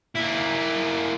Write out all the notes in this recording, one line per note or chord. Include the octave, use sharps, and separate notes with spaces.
A#3 E4